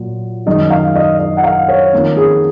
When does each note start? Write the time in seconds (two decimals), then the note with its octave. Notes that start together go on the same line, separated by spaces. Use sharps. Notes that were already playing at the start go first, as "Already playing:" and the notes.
Already playing: A#2 F#3
0.46 F#2 D#3 G#3 D#5
0.71 F5
0.96 D#5
1.19 D#5
1.37 F#5
1.44 F5
1.69 C#5
1.93 F2 D#3 A#3 C#4
2.17 G#4